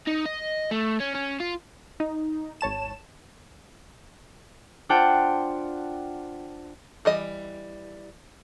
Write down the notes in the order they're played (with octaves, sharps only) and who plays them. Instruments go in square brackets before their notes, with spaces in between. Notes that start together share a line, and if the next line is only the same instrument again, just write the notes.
[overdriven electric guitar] D#4
D#5
A3
C#4
C#4
F4
[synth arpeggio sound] D#4
G#1 C#5 A5 E7
[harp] D4 F4 C5 F#5 G5 A5
[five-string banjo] E3 G3 D#5